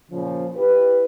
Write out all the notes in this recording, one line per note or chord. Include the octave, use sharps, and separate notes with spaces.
A#2 C#3 F3
E4 G4 B4